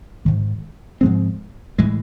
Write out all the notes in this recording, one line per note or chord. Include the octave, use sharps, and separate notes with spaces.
G#2 D#3 G#3
G#2 F3 G#3 C4
A2 E3 G#3